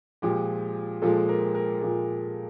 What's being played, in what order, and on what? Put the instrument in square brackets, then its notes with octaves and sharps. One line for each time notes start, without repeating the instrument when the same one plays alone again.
[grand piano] A#2 F3 G#3 G4
A#2 F3 G#3 A4
A#4
A#4
A#2 F3 G#3